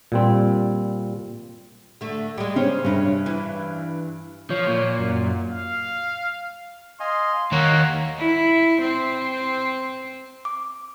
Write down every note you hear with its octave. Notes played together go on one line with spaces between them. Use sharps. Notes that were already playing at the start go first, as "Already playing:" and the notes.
A#2 G3 C4
D3 A3
G3 G#3
C#3 C#4 C5 C#5
G2 C3 C#4
E3
F3 C#5
A#2
F#2
F5
D#5 F5 G#5 C6
D#2 A#3 C#5 F#5 A#5
E4
C4
D6